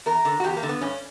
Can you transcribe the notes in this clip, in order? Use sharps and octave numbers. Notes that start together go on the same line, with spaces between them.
E2 A#4
D3
F#4
E2 G4
A#3
D3
B3
G2 C#4